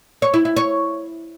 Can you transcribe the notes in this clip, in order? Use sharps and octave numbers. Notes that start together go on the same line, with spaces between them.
C#5
E4
E4
C#5